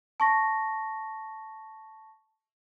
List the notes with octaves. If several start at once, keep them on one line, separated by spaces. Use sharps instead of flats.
A5 C#6 A#6